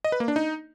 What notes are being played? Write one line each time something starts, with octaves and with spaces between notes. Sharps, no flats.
D#5
B4
A#3
D4
D#4